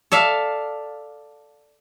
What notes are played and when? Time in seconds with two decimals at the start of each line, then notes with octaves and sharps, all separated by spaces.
0.12 A4 D5 E5 F5